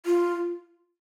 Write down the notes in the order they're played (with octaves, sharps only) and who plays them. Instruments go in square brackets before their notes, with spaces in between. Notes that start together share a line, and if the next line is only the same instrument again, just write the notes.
[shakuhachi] F4